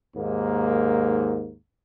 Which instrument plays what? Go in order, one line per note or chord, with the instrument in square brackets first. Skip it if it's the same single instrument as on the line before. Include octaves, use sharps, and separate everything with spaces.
[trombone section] D#2 G#2 A#3